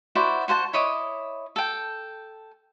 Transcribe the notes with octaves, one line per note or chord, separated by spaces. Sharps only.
E4 F#4 C5 D5
F#4 C5 F#5 A5
E4 C#5 D#5 D6
A4 G5